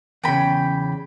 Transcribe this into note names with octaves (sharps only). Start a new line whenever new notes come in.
E2 C#3 G5 B5